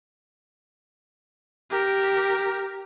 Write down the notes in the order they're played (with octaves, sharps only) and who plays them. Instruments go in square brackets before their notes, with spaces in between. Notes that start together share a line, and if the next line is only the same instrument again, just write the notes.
[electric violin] G4 A#4